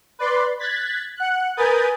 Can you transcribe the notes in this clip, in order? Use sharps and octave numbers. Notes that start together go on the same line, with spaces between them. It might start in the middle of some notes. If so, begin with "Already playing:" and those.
B4 D5 C6
F#6 G#6 A6 B6
F#5 F#6
A#4 B4 G#5 D#6 G6 A6